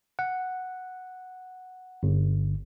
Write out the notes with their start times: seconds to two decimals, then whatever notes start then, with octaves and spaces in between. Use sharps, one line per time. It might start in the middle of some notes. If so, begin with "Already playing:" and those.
0.19 F#5
2.03 G1